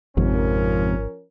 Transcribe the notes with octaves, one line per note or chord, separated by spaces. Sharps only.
G#1 F2 G#2 C3 F3 C#4 A#4